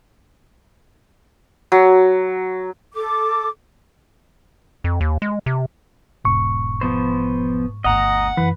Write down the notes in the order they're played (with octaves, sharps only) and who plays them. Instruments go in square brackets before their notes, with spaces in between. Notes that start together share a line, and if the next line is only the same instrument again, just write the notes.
[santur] F#3
[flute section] A4 D6
[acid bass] F2
D#2
G#3
C3
[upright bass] E1 [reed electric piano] G#2 C#6
[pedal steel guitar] F3 B3 C5
[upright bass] G1 D2 [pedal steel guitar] D#5 A#5 [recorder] F#5
[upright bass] F#2 [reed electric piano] E3 [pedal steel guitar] B4